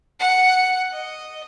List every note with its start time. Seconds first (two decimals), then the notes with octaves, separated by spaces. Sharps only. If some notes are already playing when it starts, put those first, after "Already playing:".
0.19 F#5
0.91 D#5